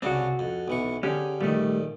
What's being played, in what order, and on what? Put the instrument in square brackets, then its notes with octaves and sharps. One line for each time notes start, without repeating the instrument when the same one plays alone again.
[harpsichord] C2 C#3 D4 [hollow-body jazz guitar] C4 F#4
[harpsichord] F2
B1 E3 C#6
[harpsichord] D3 [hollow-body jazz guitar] C#4 G4 G#4
[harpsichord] A#1 D#3 [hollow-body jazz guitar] G3 A3